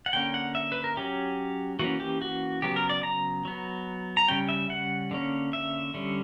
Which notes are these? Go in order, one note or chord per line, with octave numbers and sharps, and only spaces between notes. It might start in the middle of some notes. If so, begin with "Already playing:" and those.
F#5
D3 A#3 C#4 G5
F#5
E5
B4
A#4
F#3 C#4 G4
E3 A#3 C#4 F#4
G4
F#4
C#3 F#3 B3 G4
A#4
D5
A#5
F#3 B3
A#5
C#3 G3 C#4 G5
E5
F#5
D3 A#3 C#4
E5
D3 G3 C#4